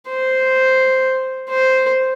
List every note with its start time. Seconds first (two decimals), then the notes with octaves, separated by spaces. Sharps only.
0.09 C5
1.49 C5